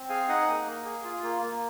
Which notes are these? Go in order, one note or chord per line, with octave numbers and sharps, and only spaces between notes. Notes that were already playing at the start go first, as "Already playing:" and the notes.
Already playing: C4
G#4 F5 G#5
D#4 D#5 F#5
A#3
A#3
G#4
F4
A#3
A#3